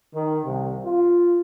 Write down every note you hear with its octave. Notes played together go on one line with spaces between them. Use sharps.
D#3
C2
F4